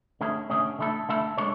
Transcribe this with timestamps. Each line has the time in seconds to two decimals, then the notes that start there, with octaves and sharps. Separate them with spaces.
0.21 D3 A3 C#4 G#4
0.50 D3 A3 C#4 G#4
0.79 D3 A3 E4 A4
1.09 D3 A3 E4 A4
1.37 G#3 D4 A4 C#5